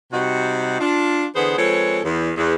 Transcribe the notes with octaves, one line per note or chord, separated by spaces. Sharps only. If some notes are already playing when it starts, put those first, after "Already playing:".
C3 G3 D#4 F#4
D4 F4
D3 E3 B3 G#4 B4 C5
F3 G#3 C4 A4 B4 C#5
E2
E2